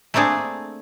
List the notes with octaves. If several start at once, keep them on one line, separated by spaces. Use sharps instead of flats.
A3 A#3 C4 D4 G#4